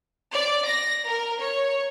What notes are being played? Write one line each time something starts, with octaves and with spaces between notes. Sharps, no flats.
D5
A#6
A#4
C#5